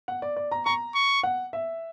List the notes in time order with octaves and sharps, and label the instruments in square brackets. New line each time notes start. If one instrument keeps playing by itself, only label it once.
[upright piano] F#5
D5
D5
A#5
[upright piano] A#5 [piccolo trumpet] C#6
[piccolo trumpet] C#6
[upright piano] F#5
E5